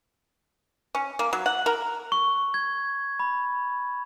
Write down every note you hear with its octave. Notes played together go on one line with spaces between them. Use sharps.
C#4
A#3
F#3
F#5
A#4
C#6
G#6
B5